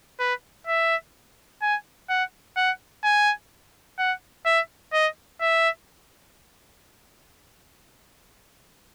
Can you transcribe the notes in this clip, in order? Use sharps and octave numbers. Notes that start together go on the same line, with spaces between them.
B4
E5
G#5
F#5
F#5
G#5
F#5
E5
D#5
E5